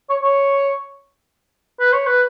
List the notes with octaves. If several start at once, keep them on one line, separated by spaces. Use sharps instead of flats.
C#5
C#5
B4
C#5
B4